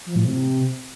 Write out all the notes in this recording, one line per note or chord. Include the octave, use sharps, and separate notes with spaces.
F3
A2
C3